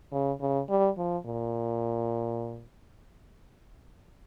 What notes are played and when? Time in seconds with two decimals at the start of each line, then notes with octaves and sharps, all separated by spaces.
0.12 C#3
0.40 C#3
0.69 G3
0.97 F3
1.25 A#2